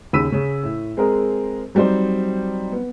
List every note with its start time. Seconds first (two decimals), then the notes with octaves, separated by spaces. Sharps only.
0.13 D#2 C#3 B5 E6 B6 D#7
0.32 C#3 C#4
0.63 A2
0.97 G#3 C4 G#4 A#4
1.75 F#3 G3 C4 D#4 C5
2.72 B3